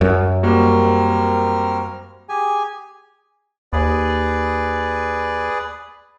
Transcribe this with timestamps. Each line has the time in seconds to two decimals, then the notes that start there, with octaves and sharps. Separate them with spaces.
0.01 F#2
0.43 G3 A#3 C4 F#4 A#4 F6
2.29 G4 G#4 G#5
3.73 D#2 G#4 B4 D5